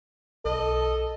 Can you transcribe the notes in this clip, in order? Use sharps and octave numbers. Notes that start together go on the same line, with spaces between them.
B1 A4 D#5